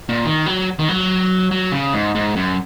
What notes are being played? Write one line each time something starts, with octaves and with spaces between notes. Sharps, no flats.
A#2
D#3
F#3
D#3
F#3
F#3
C#3
G#2
G#2
F#2